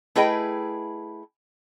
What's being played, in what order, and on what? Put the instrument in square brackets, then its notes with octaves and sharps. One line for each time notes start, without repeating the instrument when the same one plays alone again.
[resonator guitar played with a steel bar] A3 E4 G#4 B4 D#5 G5